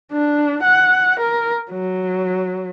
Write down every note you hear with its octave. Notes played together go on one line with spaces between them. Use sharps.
D4
F#5
A#4
F#3